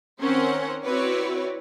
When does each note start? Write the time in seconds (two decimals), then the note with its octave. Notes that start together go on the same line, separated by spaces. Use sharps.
0.20 D#3 C4 C#4 A#4 C5 F#5
0.85 C4 E4 F#4 B4 C#5 D5